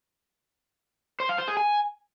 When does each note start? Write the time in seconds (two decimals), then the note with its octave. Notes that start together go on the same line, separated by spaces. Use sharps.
1.20 C5
1.29 F5
1.38 C5
1.48 G#4
1.57 G#5